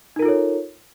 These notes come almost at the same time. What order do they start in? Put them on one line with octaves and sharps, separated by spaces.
D#4 A#4 F4 A4 C#5